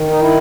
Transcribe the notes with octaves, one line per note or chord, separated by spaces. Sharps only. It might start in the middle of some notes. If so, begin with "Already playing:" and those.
Already playing: D#3
D#4
E4